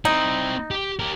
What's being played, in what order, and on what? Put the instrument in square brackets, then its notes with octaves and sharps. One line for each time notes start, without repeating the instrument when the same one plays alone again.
[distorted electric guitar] C4 E4 [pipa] D#4
[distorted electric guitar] G4
G4 A#4